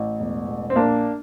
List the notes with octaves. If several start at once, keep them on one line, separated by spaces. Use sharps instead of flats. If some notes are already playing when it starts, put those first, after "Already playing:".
Already playing: A1
E1
E1
C4
A#1 A#3 D4